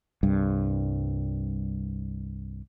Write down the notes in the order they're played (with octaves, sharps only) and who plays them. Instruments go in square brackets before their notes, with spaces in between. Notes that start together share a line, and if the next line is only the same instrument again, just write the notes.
[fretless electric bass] C2 G2